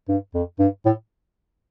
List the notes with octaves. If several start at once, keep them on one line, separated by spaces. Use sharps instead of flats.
G2
F2
G2
A2